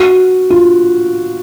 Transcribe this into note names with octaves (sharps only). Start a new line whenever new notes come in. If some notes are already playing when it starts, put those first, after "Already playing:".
Already playing: F#4
F4